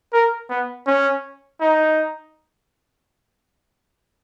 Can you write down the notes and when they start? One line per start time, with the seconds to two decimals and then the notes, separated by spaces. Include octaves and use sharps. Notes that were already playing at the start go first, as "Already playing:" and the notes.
0.13 A#4
0.49 B3
0.86 C#4
1.60 D#4